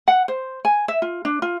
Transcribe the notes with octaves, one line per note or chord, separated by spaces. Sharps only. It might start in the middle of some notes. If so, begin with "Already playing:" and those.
F#5
C5
G#5
E5
F4
D4
F4